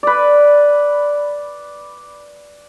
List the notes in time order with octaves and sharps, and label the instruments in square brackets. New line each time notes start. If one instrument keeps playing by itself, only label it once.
[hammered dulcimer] B4 D5